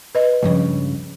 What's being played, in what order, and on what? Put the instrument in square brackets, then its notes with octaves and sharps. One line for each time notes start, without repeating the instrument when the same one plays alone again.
[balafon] B4 D#5
[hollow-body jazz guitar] C#2 G2 C#3 [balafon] F3